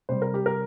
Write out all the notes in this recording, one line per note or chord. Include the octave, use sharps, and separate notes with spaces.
C3 G3 C5
A#4
G4
A#4